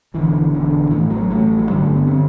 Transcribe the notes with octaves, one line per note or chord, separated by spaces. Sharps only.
E1 E2 D3 E3
E1 E2 D3
A1 A2 E3
F#3
A1 A2
F#3
G1 G2 D3 G3
A3
B3
D3 C4